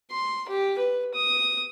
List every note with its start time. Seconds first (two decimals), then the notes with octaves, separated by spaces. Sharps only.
0.10 C6
0.49 G4
0.78 B4
1.14 D#6